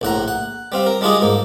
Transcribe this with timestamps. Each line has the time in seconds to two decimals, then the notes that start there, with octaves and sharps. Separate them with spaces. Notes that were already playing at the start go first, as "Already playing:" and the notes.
0.01 A#1 A2 F#5 A#5
0.28 F#5
0.72 G3 C4 F5
0.86 A#4
1.01 G3 G#3 D4 F4 G#4 D#5
1.22 G#2 A#3